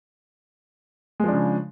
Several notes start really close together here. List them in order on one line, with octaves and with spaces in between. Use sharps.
G#3 F3 D4 C#3